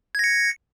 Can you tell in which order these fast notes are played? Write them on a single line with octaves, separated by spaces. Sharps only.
G#6 A#6 C#7